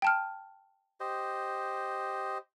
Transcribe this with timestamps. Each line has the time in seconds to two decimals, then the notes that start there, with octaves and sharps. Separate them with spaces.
0.02 G5 A5 F6
1.00 G4 C5 D#5